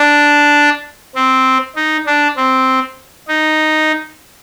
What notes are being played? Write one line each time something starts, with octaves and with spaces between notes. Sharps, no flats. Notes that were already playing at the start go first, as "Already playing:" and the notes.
Already playing: D4
C4
D#4
D4
C4
D#4